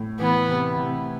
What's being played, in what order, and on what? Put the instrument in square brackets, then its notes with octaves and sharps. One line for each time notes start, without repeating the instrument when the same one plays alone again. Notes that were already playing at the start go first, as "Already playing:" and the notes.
Already playing: [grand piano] A2
[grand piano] E3 [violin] B3
[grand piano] C3
C3